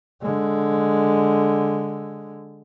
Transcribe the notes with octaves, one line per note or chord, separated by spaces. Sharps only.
D3 G#3